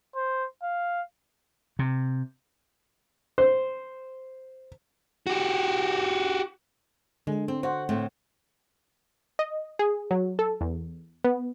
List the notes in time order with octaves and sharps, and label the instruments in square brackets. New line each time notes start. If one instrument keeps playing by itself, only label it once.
[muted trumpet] C5
F5
[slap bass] C3
[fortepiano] C5
[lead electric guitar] F#4 G4
[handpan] D3 [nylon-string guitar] G#3
[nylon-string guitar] C4
[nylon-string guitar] F#4 [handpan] C5 F#5
[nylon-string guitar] A2 A3 C4
[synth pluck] D#5
G#4
F#3
A4
E2
B3